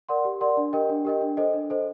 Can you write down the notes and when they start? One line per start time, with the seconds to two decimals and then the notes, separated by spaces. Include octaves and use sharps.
0.09 A#4 D5 F#5 C6
0.25 G4
0.41 A#4 D5 F#5 C6
0.57 D4
0.73 G4 A#4 D#5 G5
0.89 D4
1.05 G4 A#4 D#5 G5
1.21 D4
1.37 A4 C5 D#5
1.54 D4
1.70 A4 C5 D#5